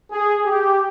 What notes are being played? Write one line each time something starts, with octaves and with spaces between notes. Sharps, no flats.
G#4
G4